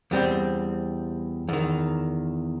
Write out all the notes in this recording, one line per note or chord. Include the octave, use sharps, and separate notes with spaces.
E2 G3 C4
E2 D#3